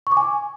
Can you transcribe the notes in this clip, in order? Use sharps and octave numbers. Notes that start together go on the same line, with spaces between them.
C#6
D6
G#5